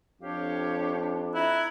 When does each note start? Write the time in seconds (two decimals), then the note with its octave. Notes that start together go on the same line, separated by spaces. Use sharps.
0.21 F2 D4 G4 C#5 F5
1.34 E4 A#5 F#6 G#6